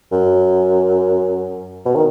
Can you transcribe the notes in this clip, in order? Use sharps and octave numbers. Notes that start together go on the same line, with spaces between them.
F#2
B2
D#3